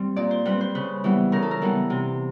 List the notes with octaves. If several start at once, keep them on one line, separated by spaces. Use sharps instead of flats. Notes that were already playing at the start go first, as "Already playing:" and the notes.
Already playing: G3 C4
A#2 D5
C5
G3 C4 B4
C5
C#3 B4
E3 G3 B3
C#3 A#4
A4
A#4
E3 G3 B3
C3